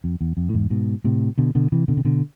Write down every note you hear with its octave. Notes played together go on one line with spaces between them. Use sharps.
F2
E2
F2
A2
E2 G#2
G#2 B2
A2 C3
B2 D3
B2 D3
C3 E3
B2 D3
C3
B2 D3